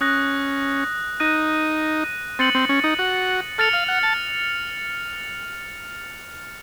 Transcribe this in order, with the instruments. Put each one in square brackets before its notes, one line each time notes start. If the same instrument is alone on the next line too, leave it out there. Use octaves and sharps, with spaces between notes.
[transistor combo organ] C#4 [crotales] D#6 F#6 A#6
[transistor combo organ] D#4 [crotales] F#6 A#6 D#7
[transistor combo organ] C4 [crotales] A6 C#7 F#7
[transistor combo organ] C4
C#4
D#4
F#4
[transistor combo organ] A4 [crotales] F6 A6 C#7 F7
[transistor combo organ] F5
F#5
A5